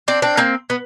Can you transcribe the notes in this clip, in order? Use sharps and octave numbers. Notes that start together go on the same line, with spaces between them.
C4 D4
C4 D4
A#3 C4
B3